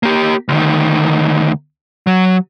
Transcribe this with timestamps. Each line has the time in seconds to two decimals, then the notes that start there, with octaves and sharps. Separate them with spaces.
0.03 A#3 G4
0.48 D2 D#3
2.07 F#3